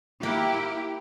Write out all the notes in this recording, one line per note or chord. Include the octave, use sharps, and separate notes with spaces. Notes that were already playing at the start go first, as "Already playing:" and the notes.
A#3 E4 G4 F#5